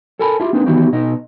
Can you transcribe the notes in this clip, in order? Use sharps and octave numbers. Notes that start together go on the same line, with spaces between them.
A4 A#4 G#5 A5 B5
E4 F4 G4
A#3 C4 D4 D#4 B4
D#3 E3 B3 D#4 F#4 G4
B2 D#4 D#5